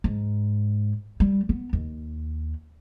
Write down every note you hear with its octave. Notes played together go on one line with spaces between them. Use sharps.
G#2
G3
B3
D#2